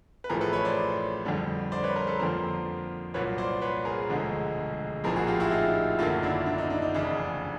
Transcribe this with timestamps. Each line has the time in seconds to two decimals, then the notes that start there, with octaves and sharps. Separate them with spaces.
0.24 B4
0.30 A1 A2 F3 A3 G#4 A#4
0.41 A4 B4
0.53 B4 C#5
0.65 C5 D5
1.25 F2 D3 G3
1.72 C5 D5
1.83 B4 C#5
1.96 A#4 C5
2.07 A4 B4
2.19 F2 D3 F3 A#3 A#4 C5
3.14 C2 A#2 F#3 A#3 B4 C#5
3.38 C5 D5
3.61 B4 C#5
3.85 G#4 A#4
4.09 E1 D2 D3 F3 G#3
5.04 A#1 A2 F3 A#3 G#4 A#4
5.16 F#4 G#4
5.27 F4 G4
5.40 E4 F#4
5.51 D#4 F4
5.99 G#1 F#2 D3 F#3 A#3 D#4 F4
6.23 D4 E4
6.46 D4
6.58 D#4
6.70 D4
6.82 D#4
6.94 F1 E2 C#3 D4